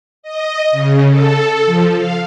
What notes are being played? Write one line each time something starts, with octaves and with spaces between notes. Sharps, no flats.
D#5
C#3
A4
F3
F5